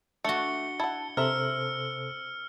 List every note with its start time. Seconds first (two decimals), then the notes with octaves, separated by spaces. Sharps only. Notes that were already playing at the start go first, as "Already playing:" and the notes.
0.24 A3 D4 F#4 C#7 G7
0.80 E4 F#5 A5
1.17 C3 A4 A#4 C5 E5 E6 F6